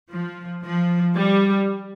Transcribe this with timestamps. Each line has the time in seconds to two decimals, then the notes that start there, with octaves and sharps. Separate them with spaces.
0.10 F3
0.63 F3
1.16 G3